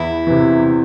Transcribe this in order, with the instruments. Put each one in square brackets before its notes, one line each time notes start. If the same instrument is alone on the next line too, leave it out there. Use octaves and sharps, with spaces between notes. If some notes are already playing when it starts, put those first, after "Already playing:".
Already playing: [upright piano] E2 [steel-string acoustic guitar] E4
[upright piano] C3 E3